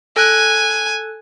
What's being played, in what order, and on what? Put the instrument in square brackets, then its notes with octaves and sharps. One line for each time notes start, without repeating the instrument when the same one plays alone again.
[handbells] A4 F#6 [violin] G#5